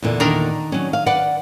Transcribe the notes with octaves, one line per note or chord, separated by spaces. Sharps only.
E2 A#2 D3
D#3 D4 A#4
F#3 C#4
F5
B4 D5 F#5